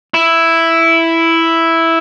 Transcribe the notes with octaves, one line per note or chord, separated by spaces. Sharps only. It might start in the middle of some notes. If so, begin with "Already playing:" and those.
E4